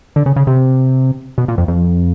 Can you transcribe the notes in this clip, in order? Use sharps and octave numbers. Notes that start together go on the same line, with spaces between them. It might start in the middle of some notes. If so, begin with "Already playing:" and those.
D3
C#3
C#3
C3
B2
A#2
F2
F2